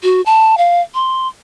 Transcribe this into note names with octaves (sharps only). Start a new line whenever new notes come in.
F#4
A5
F5
C6